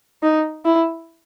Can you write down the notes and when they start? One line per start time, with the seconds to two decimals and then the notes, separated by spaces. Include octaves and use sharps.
0.23 D#4
0.65 E4